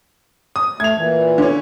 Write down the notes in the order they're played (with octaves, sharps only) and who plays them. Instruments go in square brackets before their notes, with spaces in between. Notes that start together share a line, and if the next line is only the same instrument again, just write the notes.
[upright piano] D#6
[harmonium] A3 [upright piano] G#6 F7
[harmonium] A#2 E3
[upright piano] D3 C#4